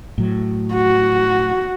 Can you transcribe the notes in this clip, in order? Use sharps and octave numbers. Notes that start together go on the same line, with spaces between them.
A2 F#3
F#4